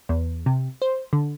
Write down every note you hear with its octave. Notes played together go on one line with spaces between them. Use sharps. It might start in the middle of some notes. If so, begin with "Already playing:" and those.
E2
C3
C5
D3